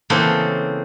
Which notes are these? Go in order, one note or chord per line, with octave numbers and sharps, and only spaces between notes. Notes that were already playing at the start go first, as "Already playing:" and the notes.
C#3 E3 A#3 C4 A4